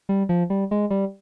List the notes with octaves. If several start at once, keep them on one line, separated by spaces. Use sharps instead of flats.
G3
F3
G3
G#3
G3